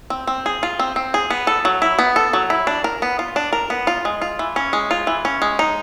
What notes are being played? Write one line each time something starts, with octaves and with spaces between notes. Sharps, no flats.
C4
C4
G#4
F4
C4
C4
G#4
B3
A4
F#3
E4
B3
A4
F#3
E4
D4
A#4
B3
F4
D4
A#4
B3
F4
G#3
F4
E3
C#4
G#3
F4
E3
C#4
G#3
D#4